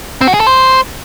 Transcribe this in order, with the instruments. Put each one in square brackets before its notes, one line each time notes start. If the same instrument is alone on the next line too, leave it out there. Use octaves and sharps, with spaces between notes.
[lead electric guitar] C4
F#4
G#4
A4
C5